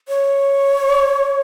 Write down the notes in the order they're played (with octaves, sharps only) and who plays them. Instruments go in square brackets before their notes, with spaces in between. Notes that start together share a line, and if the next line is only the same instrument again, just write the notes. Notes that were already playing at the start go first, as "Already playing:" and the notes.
[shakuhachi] C#5